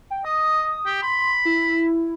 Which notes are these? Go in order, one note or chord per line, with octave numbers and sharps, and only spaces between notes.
G5
D#5 D#6
G4
B5 C6
E4